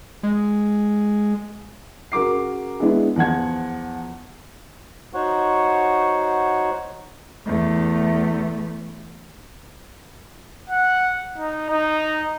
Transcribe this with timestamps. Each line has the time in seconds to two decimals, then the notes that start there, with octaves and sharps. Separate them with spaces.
0.23 G#3
2.12 C#3 F#4 A#4 D6 C7
2.80 G#3 B3 D4 E4 G#4
3.16 E2 F3 F#5 G#6
5.14 D#4 F#4 C5 C#5 F#5 C#6
7.46 E2 A3
10.70 F#5
11.38 D#4
11.70 D#4